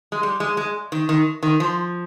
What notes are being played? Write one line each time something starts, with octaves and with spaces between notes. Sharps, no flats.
G#3
G3
G#3
G#3
D#3
D#3
D#3
F3